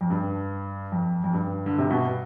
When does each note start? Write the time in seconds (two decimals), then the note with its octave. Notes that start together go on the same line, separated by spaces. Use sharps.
0.01 F2
0.10 G2
0.92 F2
1.24 F2
1.33 G2
1.66 D3
1.78 C3
1.90 B2